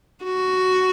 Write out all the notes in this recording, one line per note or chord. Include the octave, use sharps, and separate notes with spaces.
F#4